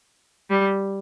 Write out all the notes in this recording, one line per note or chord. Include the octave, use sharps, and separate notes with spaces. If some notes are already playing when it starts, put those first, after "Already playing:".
G3